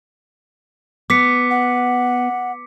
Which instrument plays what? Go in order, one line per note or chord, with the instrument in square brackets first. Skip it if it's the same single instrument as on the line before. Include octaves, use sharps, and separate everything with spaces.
[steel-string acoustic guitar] B3 [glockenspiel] D6 B6 C#7
[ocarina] F#5